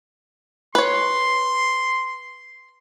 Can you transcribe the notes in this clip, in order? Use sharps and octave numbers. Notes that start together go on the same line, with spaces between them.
B4 C#5 C6